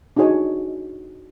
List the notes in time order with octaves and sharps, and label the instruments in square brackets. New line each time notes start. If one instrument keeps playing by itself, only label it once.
[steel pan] D4 D#4 F#4 G#4 C#5 G#5